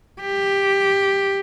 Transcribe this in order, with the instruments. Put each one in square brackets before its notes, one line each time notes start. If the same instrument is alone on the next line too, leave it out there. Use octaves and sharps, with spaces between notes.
[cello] G4